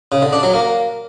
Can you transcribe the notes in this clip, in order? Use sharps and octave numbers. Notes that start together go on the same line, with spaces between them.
C#3
D3
D4
F#3
A#3